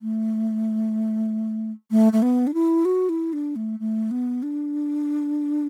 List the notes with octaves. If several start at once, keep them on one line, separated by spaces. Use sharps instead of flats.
A3
A3
A3
B3
D4
E4
F#4
E4
D4
A3
A3
B3
D4